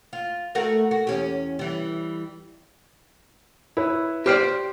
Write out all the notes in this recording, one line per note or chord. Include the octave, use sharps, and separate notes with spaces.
F4
A3 F#4 A#4
F#4
E2 C#4 G4
E3 G3
E4 B4 C#5
G4 C5 D5 C6 F6 C7